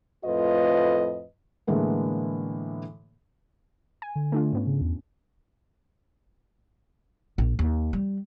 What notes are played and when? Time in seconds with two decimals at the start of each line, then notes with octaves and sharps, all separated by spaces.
0.25 F2 A2 F4 B4 D#5
1.67 A2 D3 E3 G#3 A#3 B3
4.02 G#5
4.16 D3
4.32 A3 D4 F4
4.53 G#2 B3 C#4
4.67 C#3
4.81 E2
7.38 A#1
7.59 D#2
7.93 G3